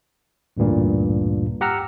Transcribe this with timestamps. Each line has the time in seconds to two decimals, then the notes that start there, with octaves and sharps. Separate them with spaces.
0.57 A1 D2 G2 A#2
1.61 G4 F#5 A#5 E6 F6